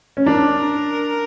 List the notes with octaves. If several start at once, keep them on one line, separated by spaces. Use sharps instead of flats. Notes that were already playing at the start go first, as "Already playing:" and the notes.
C#4
D4 A#4